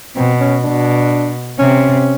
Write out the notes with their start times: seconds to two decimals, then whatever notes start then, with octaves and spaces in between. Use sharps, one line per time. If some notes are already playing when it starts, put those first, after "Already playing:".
0.16 B2 C4
0.40 C#4
0.64 B2 D4
1.59 C3 C#4